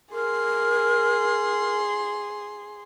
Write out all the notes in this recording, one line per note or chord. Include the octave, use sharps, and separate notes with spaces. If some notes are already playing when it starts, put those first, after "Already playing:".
G#4 A#4 C6